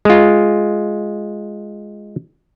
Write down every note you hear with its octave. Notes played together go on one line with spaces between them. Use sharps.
G#3 F4